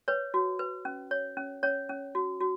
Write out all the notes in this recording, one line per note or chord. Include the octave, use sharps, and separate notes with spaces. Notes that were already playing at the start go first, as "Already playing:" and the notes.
B4 C#5
F#4
B4
C#4
C#5
C#4
C#4 C#5
C#4
F#4
F#4